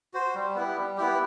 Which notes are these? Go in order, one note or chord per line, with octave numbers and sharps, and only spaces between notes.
F#4 C5
G3
B3 E4 G4
G3
B3 E4 G4